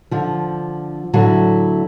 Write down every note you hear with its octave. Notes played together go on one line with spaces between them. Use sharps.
D3 F3
A2 D3 F#3 E4